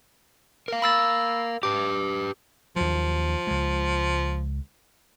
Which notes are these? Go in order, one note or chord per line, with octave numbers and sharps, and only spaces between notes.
A#4 F5
B5 E6 A6
G4 B4 D6
D#2 F3 F#3
C#2 G#3